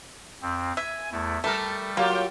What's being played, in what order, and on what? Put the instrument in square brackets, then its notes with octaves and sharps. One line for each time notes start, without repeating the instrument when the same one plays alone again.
[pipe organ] F2 C4
[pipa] E5 [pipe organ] G#5
[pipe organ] E2 A3 E4
[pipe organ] G3 [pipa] A3 [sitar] A4 A#4
[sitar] F#3 F4 G4 [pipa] A#3